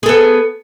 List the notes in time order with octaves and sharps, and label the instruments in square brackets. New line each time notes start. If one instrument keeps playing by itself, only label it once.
[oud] G#4
A4
B3